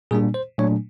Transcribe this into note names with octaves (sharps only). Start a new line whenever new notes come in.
A#2 G3 A#3 D4 G#4
C5
A#2 F#3 A3 D4 C#5